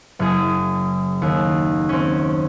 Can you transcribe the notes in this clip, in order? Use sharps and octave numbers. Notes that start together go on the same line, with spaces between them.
F#1 G#4
D#2
C4 C#4